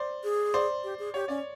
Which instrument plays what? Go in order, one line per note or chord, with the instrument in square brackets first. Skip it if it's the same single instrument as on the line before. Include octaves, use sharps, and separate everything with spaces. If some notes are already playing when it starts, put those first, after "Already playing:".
Already playing: [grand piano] C5 D5
[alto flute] G#4
[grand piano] C5 D5
[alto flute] G4
G#4
[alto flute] G4 [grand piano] C#5
[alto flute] C#4 [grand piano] D5